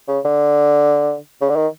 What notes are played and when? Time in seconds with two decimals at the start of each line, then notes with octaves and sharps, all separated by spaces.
0.08 C#3
0.25 D3
1.42 C#3
1.50 D3
1.56 D#3